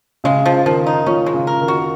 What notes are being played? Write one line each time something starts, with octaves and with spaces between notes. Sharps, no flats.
C#3 G#3
F3
D#3 F3
D#4
F3 C#4
G#3
C#3
A#4
D#3
F#4